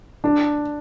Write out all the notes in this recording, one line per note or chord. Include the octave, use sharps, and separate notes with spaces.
D4